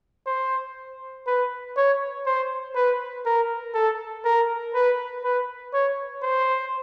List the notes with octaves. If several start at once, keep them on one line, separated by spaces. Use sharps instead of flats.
C5
B4
C#5
C5
B4
A#4
A4
A#4
B4
B4
C#5
C5